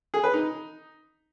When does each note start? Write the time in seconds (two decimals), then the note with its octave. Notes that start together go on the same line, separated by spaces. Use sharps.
0.14 G#4
0.24 B4
0.33 D#4